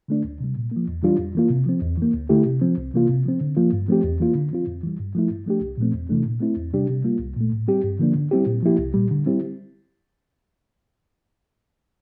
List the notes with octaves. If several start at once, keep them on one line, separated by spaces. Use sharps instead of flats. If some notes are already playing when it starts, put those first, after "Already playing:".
D3 A3 D4
D2
C3 G3
A#2
F3 A#3
E2
E3 G3 D4 F4
F2
E3 A#3 F4
C3
F3 C4
E2
E3 A#3
D2
D3 A3 E4 G4
C3
F3 C4
C2
C3 E3 A#3 F4
C3
F3 C4
D3
F3 A#3 F4
G2
F3 A3 C4 G4
E2
E3 A#3 F4
D3
F3 C4 F4
F2
E3 G3
G2
F3 A3 E4
G2
F3 A3 D4 G4
C2
A#2 F3 A3 C4
E2
C3 E3 A3 D4
A#2
A3 C4 E4
E2
C3 G3 D4 G4
C3
G3 A#3 F4
C2
A#2 A3
A2
G3 C4 G4
G2
D3 F3 A#3 D4
D3
G3 C4 E4 G4
A#2
F3 A#3 E4 G4
C2
A#2 G3
D3
G3 C4 E4 G4